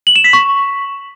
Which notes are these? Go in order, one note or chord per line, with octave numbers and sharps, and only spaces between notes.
F#7
E7
B6
C#6